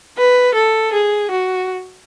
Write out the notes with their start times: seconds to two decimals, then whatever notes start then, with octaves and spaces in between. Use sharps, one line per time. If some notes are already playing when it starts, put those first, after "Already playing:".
0.17 B4
0.54 A4
0.93 G#4
1.31 F#4